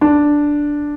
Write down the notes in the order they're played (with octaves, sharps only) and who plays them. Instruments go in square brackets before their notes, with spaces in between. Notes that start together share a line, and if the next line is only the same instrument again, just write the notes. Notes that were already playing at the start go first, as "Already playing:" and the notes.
[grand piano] D4